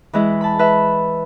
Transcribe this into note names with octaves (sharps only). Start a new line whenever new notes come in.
E3 G#3 E4
A5 B5
B4 E5